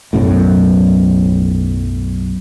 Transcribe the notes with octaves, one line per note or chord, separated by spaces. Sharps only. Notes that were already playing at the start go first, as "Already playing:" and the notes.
B1 F#2 A2